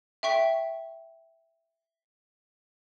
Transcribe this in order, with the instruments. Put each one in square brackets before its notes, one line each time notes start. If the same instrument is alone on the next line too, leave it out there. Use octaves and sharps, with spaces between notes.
[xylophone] E5 G5 C#6 B6